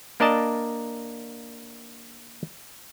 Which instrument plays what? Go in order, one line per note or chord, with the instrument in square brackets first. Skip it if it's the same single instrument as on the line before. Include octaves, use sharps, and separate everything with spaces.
[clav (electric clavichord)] A#3 D4 A#4 D5 D#5 A5